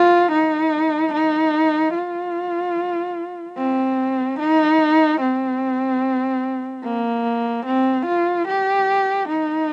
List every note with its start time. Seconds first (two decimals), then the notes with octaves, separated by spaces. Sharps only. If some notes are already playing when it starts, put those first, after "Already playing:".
Already playing: F4
0.32 D#4
1.13 D#4
1.94 F4
3.57 C4
4.39 D#4
5.21 C4
6.83 A#3
7.66 C4
8.06 F4
8.48 G4
9.29 D#4